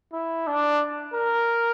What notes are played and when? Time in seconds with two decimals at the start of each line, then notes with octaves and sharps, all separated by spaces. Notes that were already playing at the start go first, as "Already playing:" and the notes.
0.13 E4
0.47 D4
1.14 A#4